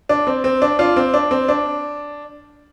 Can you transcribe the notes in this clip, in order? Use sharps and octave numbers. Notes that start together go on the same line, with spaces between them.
D4
C4
C4
D4
D4 F4
C4
D4
C4
D4